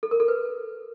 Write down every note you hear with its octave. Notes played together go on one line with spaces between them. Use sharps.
A4
A#4
A4
B4